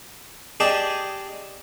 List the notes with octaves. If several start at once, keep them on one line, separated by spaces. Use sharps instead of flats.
G4 G#4 D5 D#5 A5